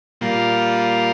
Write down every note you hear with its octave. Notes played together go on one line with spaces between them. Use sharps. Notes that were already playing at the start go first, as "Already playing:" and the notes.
A#2 G3 A#3 F4